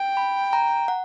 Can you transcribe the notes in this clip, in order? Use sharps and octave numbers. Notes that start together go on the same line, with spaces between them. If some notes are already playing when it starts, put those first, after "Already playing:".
Already playing: G5
B5
A#5
F#5